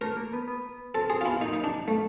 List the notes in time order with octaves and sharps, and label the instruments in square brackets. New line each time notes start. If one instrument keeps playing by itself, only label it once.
[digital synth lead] A3 [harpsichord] A#4
[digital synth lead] A#3
B3
B3
[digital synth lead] C4 [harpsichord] A4
[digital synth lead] C4 [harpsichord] G#4
[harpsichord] F4
[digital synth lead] B3 [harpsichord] E4
[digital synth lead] A#3 [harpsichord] D#4
[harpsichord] D#4
D4
A3